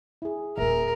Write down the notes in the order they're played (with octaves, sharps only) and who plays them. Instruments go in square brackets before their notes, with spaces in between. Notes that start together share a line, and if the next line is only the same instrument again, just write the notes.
[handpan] E4 G#4
[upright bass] D#1 A#3 [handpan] G#4 E5 [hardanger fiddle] A#4